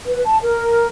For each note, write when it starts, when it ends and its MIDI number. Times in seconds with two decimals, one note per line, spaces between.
0.06 0.21 71
0.24 0.37 81
0.42 0.87 70